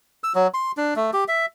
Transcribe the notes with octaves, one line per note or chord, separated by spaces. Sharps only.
E6
F#3
C6
D4
A3
G4
E5